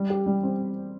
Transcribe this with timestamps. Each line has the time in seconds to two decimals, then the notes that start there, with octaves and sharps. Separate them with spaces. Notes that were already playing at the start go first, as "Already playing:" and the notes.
Already playing: G3
0.10 G4
0.26 G3
0.43 C4